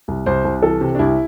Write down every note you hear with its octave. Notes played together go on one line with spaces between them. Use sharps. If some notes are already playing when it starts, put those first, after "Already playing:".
C2
C2 C5
C2
E3 A4
C3
D4
C2 E4